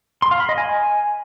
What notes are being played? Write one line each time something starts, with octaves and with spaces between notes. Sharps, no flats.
C6
F5
B5
D#5
G#5